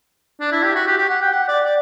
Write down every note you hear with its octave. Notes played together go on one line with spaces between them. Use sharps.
D4
E4
G4
F#4
G4
G4
F#5
G5
F#5
D5
D5